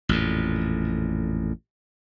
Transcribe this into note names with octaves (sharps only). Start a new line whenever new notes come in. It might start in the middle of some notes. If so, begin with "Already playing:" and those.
A1 F2 A#2